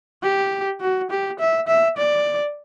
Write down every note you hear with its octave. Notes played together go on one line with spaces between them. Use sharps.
G4
F#4
G4
E5
E5
D5